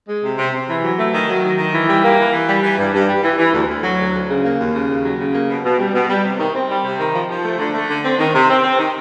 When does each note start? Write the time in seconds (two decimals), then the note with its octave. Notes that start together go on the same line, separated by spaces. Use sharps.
0.08 G#3
0.23 C3
0.38 C3
0.53 C3
0.68 E3
0.83 F#3
0.98 A3
1.13 D#3
1.29 F#3
1.43 D#3
1.58 D#3
1.73 E3
1.88 G3
2.03 A#3
2.19 E3
2.33 E3
2.49 G3
2.63 E3
2.78 G2
2.93 G2
3.08 G3
3.23 E3
3.38 E3
3.54 D2
3.68 D2
3.83 F#3
3.99 D2
4.14 D2
4.29 C#3
4.44 A#3
4.58 D#2
4.74 C#3
4.89 D#2
5.04 F#3
5.19 C#3
5.34 A#3
5.49 B2
5.64 B2
5.78 G3
5.94 B2
6.09 G3
6.24 C3
6.39 D#3
6.54 C4
6.69 G3
6.84 C3
6.99 D#3
7.14 F3
7.29 F3
7.45 A3
7.59 D3
7.74 A3
7.90 D3
8.04 C4
8.19 D#3
8.34 C3
8.49 C4
8.64 C4
8.79 D#3